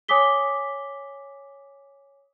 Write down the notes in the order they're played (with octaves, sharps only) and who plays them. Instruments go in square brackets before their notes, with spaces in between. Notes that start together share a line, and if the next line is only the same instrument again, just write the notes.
[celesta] C#5 G#5 D6 D#6 B6 G7